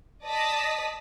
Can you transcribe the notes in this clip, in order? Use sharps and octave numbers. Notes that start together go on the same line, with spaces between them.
D5 D#5 A5 D#6 A#6 B6